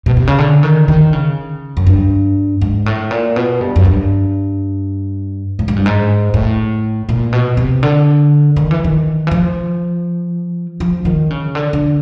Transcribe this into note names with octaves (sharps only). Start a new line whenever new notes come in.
B2
C3
C#3
D3
D#3
D#3
C#3
F#2
G2
G#2
A2
A#2
B2
G2
F#2
G2
A2
G#2
G2
G#2
A2
A#2
B2
C3
D3
D#3
E3
D#3
E3
F3
F3
D#3
C#3
D3
D3